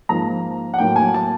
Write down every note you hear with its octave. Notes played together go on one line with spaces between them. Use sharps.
G#2 F3 A#3 A#5
F#5
A2 F#3 A#3 G5
G#5
A5